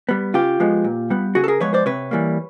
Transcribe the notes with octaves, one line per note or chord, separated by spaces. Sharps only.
G3 B3
C#3 F4 G4
F3 G#3 B3
A#2
G3 B3
C#3 F#4 G#4
A4
G#4 A#4
F3 G#3 B3 B4 C#5
C5 D5
C3 B4 C#5
E3 G3 A#3